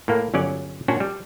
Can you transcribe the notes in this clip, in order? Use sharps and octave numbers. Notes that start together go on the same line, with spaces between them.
A2 A#3
G1 F#3 C#4 D5
A#2 C#4 D4 F#4
G3